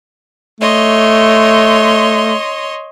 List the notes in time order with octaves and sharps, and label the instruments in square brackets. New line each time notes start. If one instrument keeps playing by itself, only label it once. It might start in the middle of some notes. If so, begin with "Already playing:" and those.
[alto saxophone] A3 [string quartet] C#5 D#5 C6